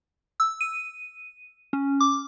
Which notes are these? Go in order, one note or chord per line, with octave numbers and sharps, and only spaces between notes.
E6
D#7
C#4
D6